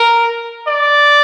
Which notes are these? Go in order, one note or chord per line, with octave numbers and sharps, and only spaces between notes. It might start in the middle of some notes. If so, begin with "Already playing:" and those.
Already playing: A#4
D5